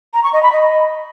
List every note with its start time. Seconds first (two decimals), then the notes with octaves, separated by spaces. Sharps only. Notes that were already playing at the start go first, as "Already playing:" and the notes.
0.13 A#5
0.23 C#6
0.33 D#5
0.42 B5
0.52 D#5